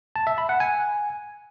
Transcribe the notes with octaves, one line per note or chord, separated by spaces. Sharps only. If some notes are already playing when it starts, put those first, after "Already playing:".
A5
E5
B5
F#5
G#5